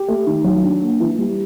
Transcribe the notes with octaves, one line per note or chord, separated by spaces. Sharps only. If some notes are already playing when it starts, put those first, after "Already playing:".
Already playing: G4
A3
D#3
F#3
D4
A#3
E3
G3